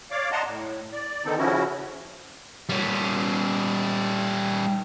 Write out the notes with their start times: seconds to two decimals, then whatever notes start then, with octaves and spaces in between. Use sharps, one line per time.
0.11 C#5 D5 F5 D6
0.32 D#5 F#5 A5 A#5 C6
0.46 A2
0.93 D5
1.25 D3 D#3 B3 C4 D#4 A4
1.38 C#3 F3 C#4 E4 F#4
2.69 G3 C#4